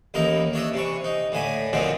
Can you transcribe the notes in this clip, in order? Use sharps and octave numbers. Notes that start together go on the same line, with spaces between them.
A1 D#2 D#4 E4 A#4 A#5
D4 C#5 D#5 E5
C3 E3 C#6
D#4
A2 D3 G#5 B5
B2 D3 D#3 F3 F#3 C4